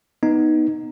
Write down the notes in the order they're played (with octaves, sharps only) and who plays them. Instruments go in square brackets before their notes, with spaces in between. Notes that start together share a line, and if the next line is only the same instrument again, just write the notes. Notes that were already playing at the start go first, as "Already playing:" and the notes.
[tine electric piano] B3 D#4